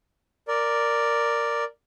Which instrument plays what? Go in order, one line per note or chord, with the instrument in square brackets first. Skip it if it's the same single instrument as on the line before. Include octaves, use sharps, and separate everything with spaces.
[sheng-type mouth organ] A#4 D5